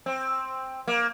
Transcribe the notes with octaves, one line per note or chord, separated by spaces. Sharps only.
C4
A#3